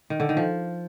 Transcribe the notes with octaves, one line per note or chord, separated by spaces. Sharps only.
D#3
D3
D#3
F3